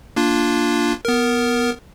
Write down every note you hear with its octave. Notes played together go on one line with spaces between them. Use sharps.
A#3 D4 F4
B3 A#4